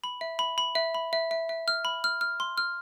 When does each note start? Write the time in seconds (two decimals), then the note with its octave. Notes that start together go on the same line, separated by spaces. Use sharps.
0.04 B5
0.21 E5
0.39 B5
0.58 B5
0.75 E5
0.94 B5
1.13 E5
1.31 E5
1.49 E5
1.68 F6
1.85 B5
2.04 F6
2.21 F6
2.40 C6
2.58 F6